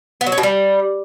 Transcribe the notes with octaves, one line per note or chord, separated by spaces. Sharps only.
B3
F#3
C#4
B2
G3